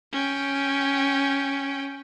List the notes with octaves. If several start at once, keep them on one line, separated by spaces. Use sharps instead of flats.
C#4 G5